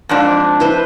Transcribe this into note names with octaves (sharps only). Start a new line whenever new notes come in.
F2 G#2 D4
E4 B4 C5